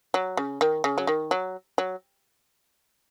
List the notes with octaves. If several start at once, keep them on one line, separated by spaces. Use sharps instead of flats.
F#3
C#3
D#3
C#3
F#3
D#3
F#3
F#3